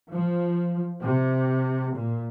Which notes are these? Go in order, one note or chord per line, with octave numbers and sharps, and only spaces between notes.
F3
C3
A#2